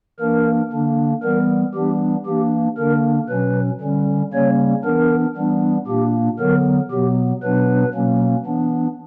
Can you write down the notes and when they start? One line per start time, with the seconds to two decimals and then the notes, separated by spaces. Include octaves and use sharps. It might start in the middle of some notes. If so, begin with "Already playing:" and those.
0.19 E3 A#3 D4 A#4
0.72 D3 A#3 D4
1.23 E3 G3 B3 A#4
1.74 E3 G3 B3 D4 G4
2.26 E3 A#3 D4 G4
2.77 D3 A#3 D4 A#4
3.29 B2 F#3 C#4 B4
3.81 D3 G3 C#4
4.33 C#3 G3 A#3 C#4 C#5
4.84 E3 B3 D4 A#4
5.36 E3 G3 B3 D4
5.87 A#2 A#3 D4 G4
6.39 D3 F#3 B3 A#4
6.91 B2 F#3 B3 G4
7.43 B2 F#3 B3 D4 B4
7.94 B2 F#3 A#3 C#4
8.46 E3 B3 D4